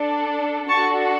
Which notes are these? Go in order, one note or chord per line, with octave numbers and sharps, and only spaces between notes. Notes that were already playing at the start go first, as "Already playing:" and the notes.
Already playing: D4 A4
D4 F#4 A4 A5 C#6